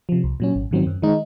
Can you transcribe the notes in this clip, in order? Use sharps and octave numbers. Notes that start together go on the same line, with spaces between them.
C3 F3
C2
A#2 F#3 C#4
G#1
G#2 D#3 F#3 C4
F#2
D#3 G#3 D#4